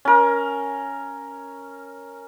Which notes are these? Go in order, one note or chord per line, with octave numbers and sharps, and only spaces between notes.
C#4 A#4